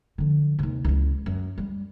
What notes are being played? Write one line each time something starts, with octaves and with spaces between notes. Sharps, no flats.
D3 F3
D#2 C3
C#2 E3
F#2
G3